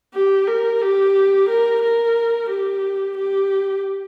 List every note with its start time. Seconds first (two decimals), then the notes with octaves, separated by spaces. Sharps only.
0.14 G4
0.47 A#4
0.81 G4
1.49 A#4
1.82 A#4
2.50 G4
3.17 G4